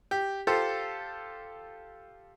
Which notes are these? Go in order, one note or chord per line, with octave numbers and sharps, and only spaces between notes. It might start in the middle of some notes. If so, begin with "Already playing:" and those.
G4
F4 G4 A4 C5